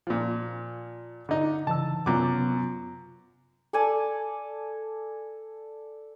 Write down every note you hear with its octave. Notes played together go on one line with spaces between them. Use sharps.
A#2 F3
D3 D#4
C#3 E3 A5 E6
F#2 C3 B3 F4 D6
A4 D5 G#5 A5